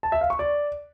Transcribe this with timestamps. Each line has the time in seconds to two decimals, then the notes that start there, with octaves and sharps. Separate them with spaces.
0.03 A5
0.12 E5
0.21 F5
0.30 C#6
0.39 D5